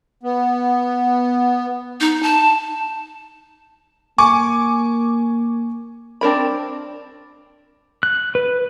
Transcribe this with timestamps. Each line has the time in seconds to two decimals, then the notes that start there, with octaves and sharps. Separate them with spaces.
0.23 B3
2.01 D#4
2.23 A5
4.18 A#3 G#5 C#6 D6
6.21 C4 D4 A#4 B5
8.03 F#6
8.35 B4